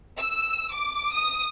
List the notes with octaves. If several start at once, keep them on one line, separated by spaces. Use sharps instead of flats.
E6
D6
D#6